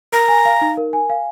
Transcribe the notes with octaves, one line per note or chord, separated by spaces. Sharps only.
A#4 A#5
G#5
F5
D#4
A#4
G#5
F5